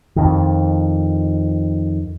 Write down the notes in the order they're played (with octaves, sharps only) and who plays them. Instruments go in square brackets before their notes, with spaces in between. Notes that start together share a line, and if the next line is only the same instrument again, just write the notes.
[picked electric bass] F2 D#3